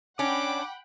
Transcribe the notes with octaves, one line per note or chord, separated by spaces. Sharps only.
C#4 D4 F#5 G5 B5 D6